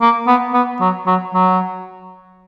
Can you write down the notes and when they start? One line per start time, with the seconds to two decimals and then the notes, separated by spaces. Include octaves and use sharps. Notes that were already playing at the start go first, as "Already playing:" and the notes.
0.01 A#3
0.27 B3
0.54 B3
0.81 F#3
1.06 F#3
1.34 F#3